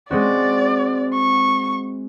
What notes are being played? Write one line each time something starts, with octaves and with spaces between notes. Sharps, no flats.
G#3 C4 F#4 D5
C#6